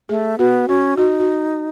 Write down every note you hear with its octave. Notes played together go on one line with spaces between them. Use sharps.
A3 G#4
B3 F#4
C#4 F#4
D#4 F#4
F#4